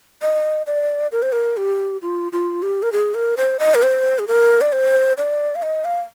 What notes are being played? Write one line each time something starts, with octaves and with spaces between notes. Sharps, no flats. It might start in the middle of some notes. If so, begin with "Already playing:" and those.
D#5
D5
A#4
C5
A#4
G4
F4
F4
G4
A#4
G#4
A#4
C5
D#5
A#4
C5
G#4
A#4
D5
C5
D5
F5
D#5
F5